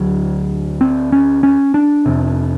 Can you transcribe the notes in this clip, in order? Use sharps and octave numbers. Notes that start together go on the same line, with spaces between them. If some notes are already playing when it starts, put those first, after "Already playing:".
Already playing: D2 D3 F#3
C4
C#4
C#4
D4
F1 F2 C3